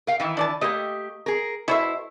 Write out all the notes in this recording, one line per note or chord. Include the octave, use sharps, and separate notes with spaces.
A#4 F5 G5
D#3 E3 E4
D4 D5 A5
A3 A#3 G4 D#5
G#4 A#4
B2 A3 E4 C5 E5